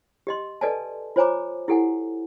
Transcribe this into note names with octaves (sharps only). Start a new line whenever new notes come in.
G4 D#5 C6
A4 B4 D5 D#5 G#5 A5
F4 C5 C#5 G#5 A#5 D6
E4 G4 A4 F#5 G#5